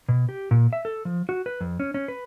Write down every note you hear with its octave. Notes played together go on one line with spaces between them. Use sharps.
B2
G4
A#2
E5
A4
F3
F#4
B4
F2
C#4
C#4
B4